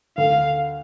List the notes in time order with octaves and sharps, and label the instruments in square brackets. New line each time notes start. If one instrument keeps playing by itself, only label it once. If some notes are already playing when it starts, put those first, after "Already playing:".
[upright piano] D2 [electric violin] F5